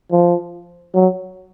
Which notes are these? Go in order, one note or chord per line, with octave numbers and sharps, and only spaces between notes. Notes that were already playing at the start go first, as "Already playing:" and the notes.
F3
F#3